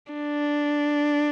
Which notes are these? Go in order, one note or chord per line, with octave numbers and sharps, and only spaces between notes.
D4